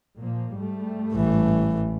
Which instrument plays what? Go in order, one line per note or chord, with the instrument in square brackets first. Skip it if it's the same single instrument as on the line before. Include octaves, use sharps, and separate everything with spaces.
[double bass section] A#2 F3 A#3
G#2 G3 A3
[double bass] A1 E3